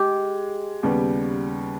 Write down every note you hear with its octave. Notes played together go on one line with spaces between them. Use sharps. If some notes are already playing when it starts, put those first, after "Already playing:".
Already playing: G#3 G4
D#2 C#3 G3 B3